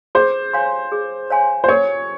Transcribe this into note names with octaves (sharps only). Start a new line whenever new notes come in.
G#4 C5
C#5 F5 G#5 C6
G#4
C#5 F5 G#5 C6
C5
A#4 C#5